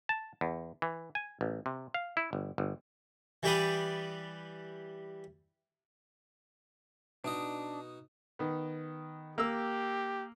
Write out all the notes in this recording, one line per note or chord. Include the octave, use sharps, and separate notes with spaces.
A5
E2
E3
G#5
A1
C3
F5
E4
G1
G1
E3 G3 G4 B4 D5 D#6
B2 D4 D#4 D#5
D#3 B3
A#3 G4 E6